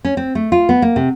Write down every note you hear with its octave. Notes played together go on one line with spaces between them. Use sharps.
C#4
C4
A3
F4
B3
A#3
C3